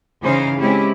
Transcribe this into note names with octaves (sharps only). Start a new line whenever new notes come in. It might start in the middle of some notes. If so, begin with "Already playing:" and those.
C#3 E3 D#4 G#4 C5 F5
G#3 C4 C#4 E4 G4